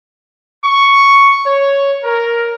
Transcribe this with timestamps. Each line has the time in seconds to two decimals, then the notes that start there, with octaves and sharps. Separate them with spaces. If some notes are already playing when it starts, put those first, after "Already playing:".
0.65 C#6
1.46 C#5
2.04 A#4